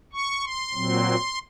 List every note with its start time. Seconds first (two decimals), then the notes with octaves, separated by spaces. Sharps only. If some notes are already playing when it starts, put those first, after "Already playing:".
0.13 C#6
0.43 C6
0.74 A#2 F#3 C4